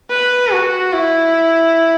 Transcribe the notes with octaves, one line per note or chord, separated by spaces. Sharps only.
B4
F#4
E4